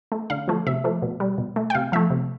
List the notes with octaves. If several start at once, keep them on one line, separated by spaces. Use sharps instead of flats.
A3
D3 F5
F3 A3
C3 E5
F3 A3
B2
G3
B2
A3
G5
C3 F5
F3 A3 E5
C3